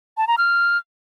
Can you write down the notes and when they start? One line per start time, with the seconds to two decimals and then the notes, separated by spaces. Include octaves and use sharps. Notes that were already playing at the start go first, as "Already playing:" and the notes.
0.17 A5
0.27 A#5
0.38 F6